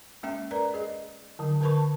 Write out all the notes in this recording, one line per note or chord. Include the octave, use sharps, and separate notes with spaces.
G#3 A#3 C#4 E5 G5
A#4 B4 D5 A#5
G#4 D#5
D3 F#3
D3 A#4 B4 A5 B5 C#6